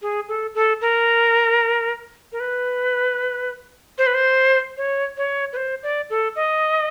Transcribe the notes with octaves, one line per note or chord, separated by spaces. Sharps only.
G#4
A4
A4
A#4
A#4
B4
C5
B4
C5
C#5
C#5
B4
C5
D5
A4
D#5